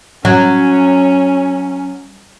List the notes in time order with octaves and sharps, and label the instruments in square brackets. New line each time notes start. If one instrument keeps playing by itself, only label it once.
[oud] F#3 [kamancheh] C#4